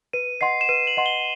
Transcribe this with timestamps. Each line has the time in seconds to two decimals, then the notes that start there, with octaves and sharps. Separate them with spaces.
0.13 B4 D#7
0.41 D#5 F#5 C6 C7
0.61 E7
0.69 B4 D#7
0.87 F#7
0.97 D#5 F#5 C6
1.06 G7